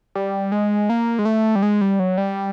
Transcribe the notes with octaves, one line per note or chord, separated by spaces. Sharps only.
G3
G#3
A#3
G#3
A3
G3
G#3
G3
F#3
G3